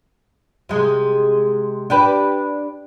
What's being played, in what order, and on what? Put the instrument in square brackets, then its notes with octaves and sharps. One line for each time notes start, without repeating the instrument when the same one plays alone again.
[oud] C3 G#3
D4 G4 B4